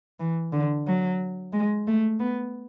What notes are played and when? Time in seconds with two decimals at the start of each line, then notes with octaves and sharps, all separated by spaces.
0.20 E3
0.53 D3
0.87 F#3
1.53 G#3
1.87 A3
2.20 B3